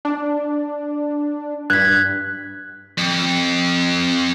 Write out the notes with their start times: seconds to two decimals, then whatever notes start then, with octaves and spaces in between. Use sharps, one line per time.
0.05 D4
1.70 G2 F#6 G#6 B6
2.98 F2